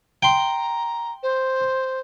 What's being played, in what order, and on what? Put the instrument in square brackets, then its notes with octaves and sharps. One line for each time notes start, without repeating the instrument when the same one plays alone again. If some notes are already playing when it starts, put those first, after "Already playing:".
[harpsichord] G5 C6 [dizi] A#5
[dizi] C5